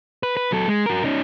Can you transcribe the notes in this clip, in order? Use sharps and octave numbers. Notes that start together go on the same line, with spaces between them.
B4
B4
F#3 A4
G#3
F#4 A#4
C#4 D#4